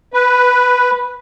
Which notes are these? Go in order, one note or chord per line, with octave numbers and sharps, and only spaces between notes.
B4